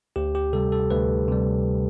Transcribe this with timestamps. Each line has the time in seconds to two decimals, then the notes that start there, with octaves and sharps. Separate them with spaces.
0.16 D2 G4
0.35 G4
0.53 C3 G3 A4
0.72 A4
0.90 D2 B4
1.28 C3 G3